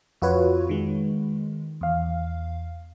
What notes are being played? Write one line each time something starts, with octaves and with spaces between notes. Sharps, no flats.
F2 F4 F#4 B4 C#5
D#3 G#3
E2 F5